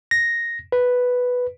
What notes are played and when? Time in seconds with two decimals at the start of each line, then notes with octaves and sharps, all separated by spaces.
0.11 A#6
0.72 B4